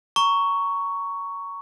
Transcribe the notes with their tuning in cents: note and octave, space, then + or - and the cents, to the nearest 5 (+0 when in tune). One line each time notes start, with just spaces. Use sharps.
A#5 -10 C#6 +10